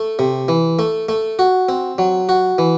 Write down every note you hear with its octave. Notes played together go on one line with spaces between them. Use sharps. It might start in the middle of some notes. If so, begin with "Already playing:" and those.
Already playing: A3
C3
E3
A3
A3
F#4
C4
F#3
F#4
E3